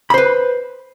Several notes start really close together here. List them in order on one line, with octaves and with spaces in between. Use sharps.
B5 C5 B4